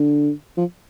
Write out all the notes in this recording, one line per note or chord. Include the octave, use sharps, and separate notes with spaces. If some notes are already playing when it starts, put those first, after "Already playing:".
Already playing: D3
F3